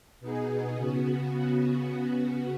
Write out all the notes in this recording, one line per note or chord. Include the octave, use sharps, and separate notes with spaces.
B2 B3 D#4 G#4
C#3 B3 F#4